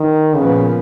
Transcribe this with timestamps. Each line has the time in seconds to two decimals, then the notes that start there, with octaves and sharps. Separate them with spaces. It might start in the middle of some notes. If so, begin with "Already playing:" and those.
Already playing: D#3
0.35 A#2 C#3 F3 B3